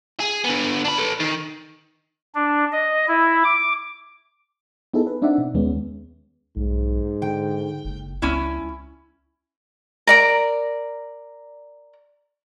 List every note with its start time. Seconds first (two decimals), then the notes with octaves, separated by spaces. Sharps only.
0.20 G#4
0.45 D3 B3
0.84 D4 B5
0.98 A4 B4
1.20 D#3
2.34 D4
2.72 D#5
3.08 E4
3.44 D6
4.94 B3 D#4 E4 G#4 A4
5.07 B4
5.22 C4 D4 D#4 D5 E5 F#5
5.38 B2
5.54 D#2 G#3 B3 C#4
6.56 B1 G#2
7.22 D3 G5
7.85 F#1
8.22 C#2 C#4 E4
10.07 A#4 D5 A#5